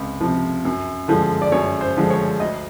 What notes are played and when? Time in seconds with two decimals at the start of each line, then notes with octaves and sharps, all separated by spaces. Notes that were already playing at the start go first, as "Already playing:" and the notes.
Already playing: C#2 C3
0.21 C3 F3
0.65 F#2
1.08 D3 F3 G#3
1.42 D5
1.52 F#2 C#5
1.81 C5
1.96 D3 F3 G#3
2.10 C#5
2.39 D2 D#5